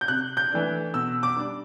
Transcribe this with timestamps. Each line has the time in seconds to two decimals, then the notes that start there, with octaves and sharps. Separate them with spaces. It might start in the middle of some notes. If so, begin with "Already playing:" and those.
0.01 G6
0.08 C3 F#6
0.37 G6
0.52 E3 A3 D4
0.94 B2 E6
1.23 D6
1.37 G3 D4